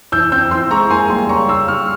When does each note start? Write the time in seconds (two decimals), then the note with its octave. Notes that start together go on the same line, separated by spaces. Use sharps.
0.12 E3 E6 G6
0.32 C4 E6 G6
0.51 E3 C6 E6
0.71 G#3 A#5 C#6
0.90 A#3 G#5 C6
1.10 G3 G#5 C6
1.29 C#3 A#5 C#6
1.49 C#3 C6 E6
1.68 G3 C#6 F6